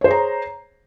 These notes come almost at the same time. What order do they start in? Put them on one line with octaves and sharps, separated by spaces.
C#5 C5 G#4 A#5